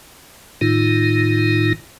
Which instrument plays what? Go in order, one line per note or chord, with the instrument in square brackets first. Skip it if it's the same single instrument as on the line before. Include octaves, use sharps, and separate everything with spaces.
[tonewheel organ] A2 D#3 D#4 F4